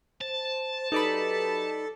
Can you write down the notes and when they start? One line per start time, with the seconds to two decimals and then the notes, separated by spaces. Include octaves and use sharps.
0.21 C5 A5
0.92 F#3 D#4 G4 A4 B4 D5 B5